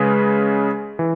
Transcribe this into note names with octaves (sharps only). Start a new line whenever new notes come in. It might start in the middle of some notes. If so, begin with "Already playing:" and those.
Already playing: C#3 G#3 C#4 G#4 B4
E3